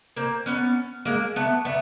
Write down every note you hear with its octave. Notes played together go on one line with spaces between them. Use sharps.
A#3 C4
B3 C#4
G#3 A#3
A3 B3
A3 B3